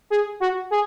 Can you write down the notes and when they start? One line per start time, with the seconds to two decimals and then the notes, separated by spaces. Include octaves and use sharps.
0.10 G#4
0.40 F#4
0.71 G#4